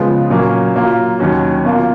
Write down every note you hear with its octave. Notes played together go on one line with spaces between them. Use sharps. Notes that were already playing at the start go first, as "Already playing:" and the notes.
Already playing: C#3 F3 G#3 B3 F4
A#2 F#3 A#3 C#4
F#3 A#3 F4 A#4
D#2 D#3 F#3 C#4 F#4
B2 A#3 F4